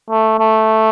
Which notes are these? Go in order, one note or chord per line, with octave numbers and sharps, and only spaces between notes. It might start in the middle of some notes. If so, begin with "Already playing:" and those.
A3
A3